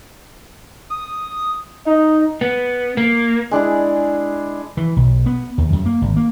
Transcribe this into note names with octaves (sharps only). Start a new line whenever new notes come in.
D#6
D#4 D#5
B3
A#3
G#3 D4 E4 G#4
E3
B1
B3
D#2
F#2
A#3
G#1
A#3